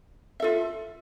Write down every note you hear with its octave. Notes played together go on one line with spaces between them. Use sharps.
F4 A4 E5